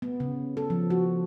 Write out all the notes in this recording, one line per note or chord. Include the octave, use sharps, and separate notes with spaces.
B3
C#3
A4
F3
F#4